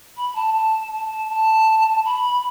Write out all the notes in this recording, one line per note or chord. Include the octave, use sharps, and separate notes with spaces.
B5
A5
A5
A5
A5
B5